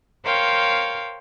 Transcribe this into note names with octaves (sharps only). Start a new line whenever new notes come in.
A#4 C5 C#5 F5 G5